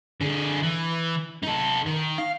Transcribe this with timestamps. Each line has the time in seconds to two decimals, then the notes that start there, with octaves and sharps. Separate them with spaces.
0.21 D3 G#4
0.63 E3
1.43 D#4 A4
1.86 D#3
2.18 F5